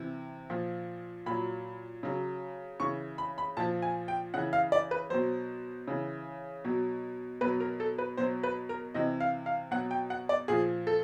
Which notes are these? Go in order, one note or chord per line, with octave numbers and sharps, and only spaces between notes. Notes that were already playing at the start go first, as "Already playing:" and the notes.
Already playing: C3 E3
A#2 F3
A#2 F#3 B5
C#3 F#3
C#3 E3 C#6
B5
B5
A#2 F3 A5
G#5
G5
C#3 E3 F#5
F5
D5
B4
B2 F#3 C5
C#3 E3
B2 F#3
B2 F#3 B4
A#4
A4
B4
B2 F#3 C5
B4
A#4
C3 E3 D#5
F5
F5
B2 F#3 F#5
G5
F#5
D5
A#2 F3 G#4
A4